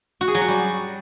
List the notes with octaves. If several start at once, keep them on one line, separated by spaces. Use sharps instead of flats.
F#4
G#4
F#3
F#4
G3